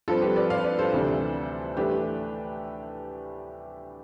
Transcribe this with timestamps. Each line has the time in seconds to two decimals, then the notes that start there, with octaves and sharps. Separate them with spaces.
0.08 G2 F3 C4 F4 A4
0.22 G4 B4
0.36 B4 D5
0.50 D5 F5
0.64 B4 D5
0.79 A4 C5
0.92 D2 C3 E3 G3 D4
1.77 A2 E3 A3 D4 G4 B4